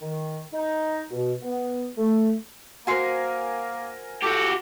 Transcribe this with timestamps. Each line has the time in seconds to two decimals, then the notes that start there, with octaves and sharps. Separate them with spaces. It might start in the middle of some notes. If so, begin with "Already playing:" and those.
0.01 D#3
0.53 D#4
1.11 B2
1.42 B3
1.97 A3
2.87 A#3 F#4 A#4 C5 G#5
4.23 F#4 G4 A4